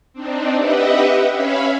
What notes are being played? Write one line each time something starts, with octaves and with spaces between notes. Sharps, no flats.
C4 D4 D#4
G4 B4 D#5 E5 F#5
C#4 C#5 E5 F5 B5